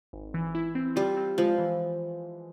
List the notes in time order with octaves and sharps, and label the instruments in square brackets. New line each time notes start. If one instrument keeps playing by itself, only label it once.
[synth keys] G#1
E3
E4
C4
[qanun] G3 [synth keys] F4
[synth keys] C4
[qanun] F3 [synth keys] G#3
[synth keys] E3